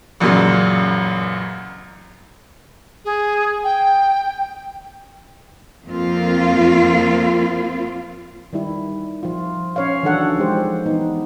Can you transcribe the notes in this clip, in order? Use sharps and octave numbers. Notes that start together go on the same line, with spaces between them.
A1 F#2 A#2 C#3 F#3
G#4
G5
F2 A#3 C4 F4
D#3 G3 E4
F3 F4
C#4 C#5 F5
D#3 E3 F#3 D4 A4 F#5
F3 G#3 G4 C5
E3 B3 D#4